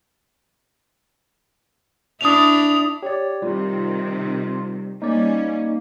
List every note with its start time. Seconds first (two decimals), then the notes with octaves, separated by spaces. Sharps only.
2.21 D4 E4 D#6 F7
3.03 G4 C#5 D5
3.42 C3 D#3 G3 F4
5.02 G3 A#3 C#4 D#4 D5